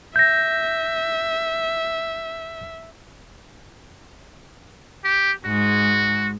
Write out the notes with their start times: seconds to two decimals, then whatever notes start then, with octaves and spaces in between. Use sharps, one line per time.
0.16 E5 G6 A#6
5.04 G4
5.45 G#2 G#3 F#4